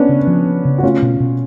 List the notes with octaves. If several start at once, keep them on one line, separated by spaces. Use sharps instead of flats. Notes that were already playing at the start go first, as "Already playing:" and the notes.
Already playing: B3 C#4 D4
C#3
F3
B3
C#3
F#4
A3 C#4 F4
B2
B2